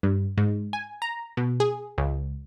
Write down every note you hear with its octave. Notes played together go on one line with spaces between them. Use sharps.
G2
G#2
G#5
A#5
B2
G#4
C#2